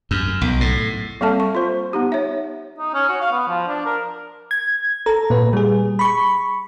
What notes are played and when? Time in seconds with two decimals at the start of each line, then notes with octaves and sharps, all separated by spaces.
0.11 F#2
0.41 B1
0.61 A2
1.21 G3 A#3 C4 A4 E5 A5
1.40 C#6
1.55 F4 C5
1.93 B3 D#4 G4
2.12 C#5 E5
2.78 D#4
2.94 C#4
3.09 F#4
3.21 F5
3.32 B3
3.48 F3
3.68 D4
3.86 A#4
4.51 G#6
5.06 A4 A#5
5.30 A#2 B4
5.53 G3 G#4
5.99 B5 C#6